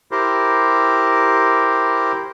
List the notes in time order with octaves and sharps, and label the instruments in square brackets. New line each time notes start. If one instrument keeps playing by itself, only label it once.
[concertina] E4 G4 A#4 C5